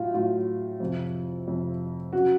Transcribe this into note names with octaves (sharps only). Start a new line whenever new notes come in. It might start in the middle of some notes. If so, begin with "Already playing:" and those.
Already playing: A2 F#3 F4
A2 F#3 F4
F2 C3 F3
F2 C3 F3
C#3 F#3 F#4